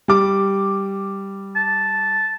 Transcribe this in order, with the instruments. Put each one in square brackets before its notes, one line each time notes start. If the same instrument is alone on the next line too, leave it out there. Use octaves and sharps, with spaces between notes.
[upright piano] G3 D6
[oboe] A5